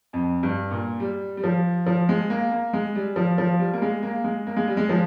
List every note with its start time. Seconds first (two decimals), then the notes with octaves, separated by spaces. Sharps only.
0.13 F2
0.43 G2
0.71 A#2
1.00 G3
1.37 G3
1.44 F3
1.86 F3
2.09 G#3
2.30 A#3
2.51 A#3
2.73 G#3
2.95 G3
3.16 F3
3.38 F3
3.59 G3
3.73 A#3
3.82 G#3
4.03 A#3
4.24 G#3
4.47 A#3
4.56 G#3
4.68 G3
4.77 G#3
4.89 F3